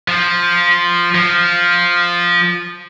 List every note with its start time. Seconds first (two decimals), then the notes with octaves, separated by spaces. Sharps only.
0.08 F3
1.15 F3